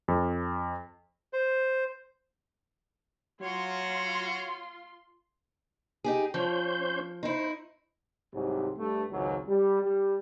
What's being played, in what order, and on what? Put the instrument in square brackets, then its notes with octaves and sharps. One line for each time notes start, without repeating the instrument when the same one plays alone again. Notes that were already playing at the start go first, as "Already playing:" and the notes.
[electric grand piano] F2
[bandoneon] C5
[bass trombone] F#3 [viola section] F4 C6 [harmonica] F#4 C#5
[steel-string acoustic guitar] D#4 G4 G#4
[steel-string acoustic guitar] F3 [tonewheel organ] C#4 C5 G6
[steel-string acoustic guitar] D#4 E4 [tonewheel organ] C5
[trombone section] C2 G#2 C3 F#3
G2 A3
G#1 C#2 C#3 F#3
G3
G3